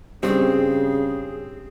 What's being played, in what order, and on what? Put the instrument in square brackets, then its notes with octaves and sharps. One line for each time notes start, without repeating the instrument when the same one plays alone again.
[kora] G2 [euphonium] C#3 [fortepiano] C4 [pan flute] G#4